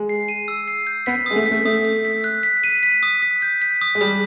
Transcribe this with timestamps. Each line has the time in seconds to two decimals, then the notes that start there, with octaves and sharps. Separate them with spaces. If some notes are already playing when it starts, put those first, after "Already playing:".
Already playing: G#3
0.09 C7
0.28 D#7
0.48 E6
0.68 C7
0.87 G6
1.06 B3 B6
1.26 G#3 D#6
1.36 A3
1.46 B6
1.51 A3
1.65 A3 D#6
1.85 D#6
2.05 B6
2.24 F#6
2.43 B6
2.64 D#7
2.83 B6
3.03 D#6
3.22 B6
3.42 G6
3.62 B6
3.82 D#6
3.95 G#3
4.01 G3 D#6